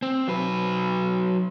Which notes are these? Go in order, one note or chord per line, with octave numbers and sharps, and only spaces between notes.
C4
F#3 B4